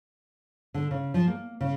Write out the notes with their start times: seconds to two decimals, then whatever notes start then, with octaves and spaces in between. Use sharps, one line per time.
0.74 D3
0.91 C#3
1.14 F3
1.28 A#3
1.61 C#3